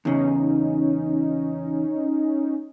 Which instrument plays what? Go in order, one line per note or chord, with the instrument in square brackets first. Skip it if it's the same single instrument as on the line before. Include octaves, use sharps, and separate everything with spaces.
[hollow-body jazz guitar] E2 C#3 [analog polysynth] C#4 D#4